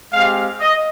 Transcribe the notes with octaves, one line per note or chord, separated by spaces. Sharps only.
G#3 C4 G4 F5
D#5